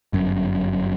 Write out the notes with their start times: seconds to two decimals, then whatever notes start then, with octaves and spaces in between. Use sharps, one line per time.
0.13 G1 F#2